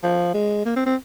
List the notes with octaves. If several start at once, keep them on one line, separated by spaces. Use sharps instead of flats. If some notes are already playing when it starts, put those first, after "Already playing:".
F3
G#3
A#3
C4
C4